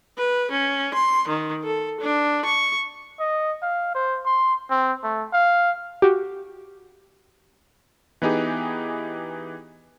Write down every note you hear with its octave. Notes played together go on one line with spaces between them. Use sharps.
B4
C#4
C6
D#3
A4
D4
C#6
D#5
F5
C5
C6
C4
A3
F5
F#4 G4
E3 B3 D#4 G4 G#4